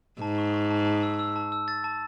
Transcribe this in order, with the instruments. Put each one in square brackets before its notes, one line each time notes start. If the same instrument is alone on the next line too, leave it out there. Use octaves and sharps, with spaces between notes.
[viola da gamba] G#2 [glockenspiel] A5
[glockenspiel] C#6
C#6
A5
A5
E6
E6
A5
E6
A6
A5